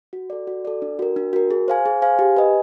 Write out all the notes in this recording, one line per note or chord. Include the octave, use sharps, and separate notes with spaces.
F#4
A4 D5
F#4
A4 D5
D4
F#4 A#4
D4
F#4 A#4
G#4
C5 F5 G#5
G#4
C5 F5 G#5
G4
B4 D#5 G#5